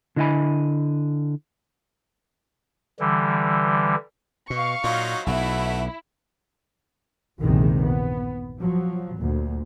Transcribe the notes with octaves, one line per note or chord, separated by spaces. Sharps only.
D3 E4 D#5 E5 G#5 B5
D3 E3 G3
B2 F5 C#6
A#2 F#3 D#4 F4
B1 B2 A3 E4 F#4
A#1 E2 G2 C3 D#3 G#3
B3
F3 F#3
D2 A#2